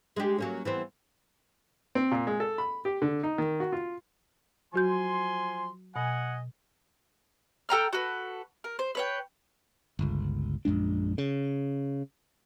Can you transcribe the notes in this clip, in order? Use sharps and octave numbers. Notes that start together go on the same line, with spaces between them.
G#3 D4 G4
F#3 A#3 C#4
E3 B3 C4
C4
A#2
G#3
A4
B5
G4
D3
D#4
D#3
F#4
F4
F3 F#3 F#4 G#5 C6 G6
B2 D#5 F#5 G#5
A4 G5 A#5 F6
F#4 A4 B4
A#4
C5
B4 C#5 G5
G1 C#2
A#1 F#2 G#3 D4
C#3